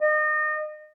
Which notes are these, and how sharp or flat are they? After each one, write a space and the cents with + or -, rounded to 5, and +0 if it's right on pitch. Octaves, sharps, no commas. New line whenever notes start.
D#5 -30